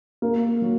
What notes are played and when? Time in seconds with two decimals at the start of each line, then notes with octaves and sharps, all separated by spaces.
0.22 A#3
0.62 F#3